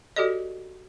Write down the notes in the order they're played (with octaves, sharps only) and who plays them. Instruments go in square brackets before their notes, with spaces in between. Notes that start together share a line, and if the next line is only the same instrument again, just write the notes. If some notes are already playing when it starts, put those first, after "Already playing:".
[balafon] F#4 G4 A4 D5 D#5